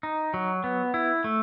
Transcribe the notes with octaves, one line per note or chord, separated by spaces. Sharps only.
D#4
F#3
B3
E4
A3